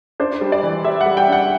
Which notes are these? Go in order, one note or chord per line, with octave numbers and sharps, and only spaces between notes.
D4 C5
G3
D5
E3
G3 E5
F#5
G3
G5
D4 F#5